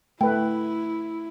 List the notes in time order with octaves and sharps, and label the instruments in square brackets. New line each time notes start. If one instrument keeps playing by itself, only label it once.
[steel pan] A3 B4 [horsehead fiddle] E4 [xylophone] G5